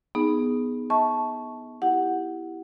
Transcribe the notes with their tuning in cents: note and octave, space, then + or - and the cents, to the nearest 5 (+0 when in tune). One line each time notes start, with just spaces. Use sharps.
B3 +0 D#4 +0 G#4 +0
E5 -40 A5 -10 C#6 +0
E4 +0 G4 +0 F#5 +0